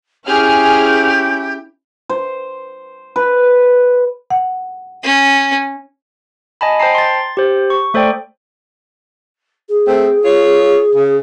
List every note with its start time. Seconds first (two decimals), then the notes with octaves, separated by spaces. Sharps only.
0.27 C#4 E4 G4 G#4 F6
2.09 C5
3.16 B4
4.30 F#5
5.03 C#4
6.61 D#5 G#5 A5 B5
6.80 C5 G5 A5 A#5 C7
6.95 C6 A6
7.37 G4 C5
7.70 C#6
7.94 A3 A4 C5 D5 G5
9.69 G#4
9.88 A3 C4
10.25 F4 C#5
10.96 C#3